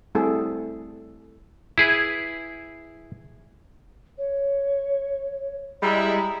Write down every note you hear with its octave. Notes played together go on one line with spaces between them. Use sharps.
G3 A3 C4 E4 G#4 A4
E4 G#4 B4
C#5
G3 G#3 E4 A#5